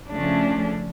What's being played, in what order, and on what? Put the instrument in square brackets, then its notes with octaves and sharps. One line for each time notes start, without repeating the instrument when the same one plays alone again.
[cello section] C#3 F3 A3 C#4 [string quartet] D4